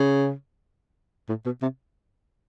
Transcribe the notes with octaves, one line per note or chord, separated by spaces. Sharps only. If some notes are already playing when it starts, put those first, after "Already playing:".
Already playing: C#3
A2
B2
C3